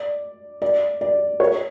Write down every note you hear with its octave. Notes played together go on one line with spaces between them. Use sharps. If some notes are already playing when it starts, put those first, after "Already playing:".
Already playing: D5
D5
D5
C#5